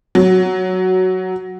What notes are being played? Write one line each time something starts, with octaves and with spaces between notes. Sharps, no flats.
F#3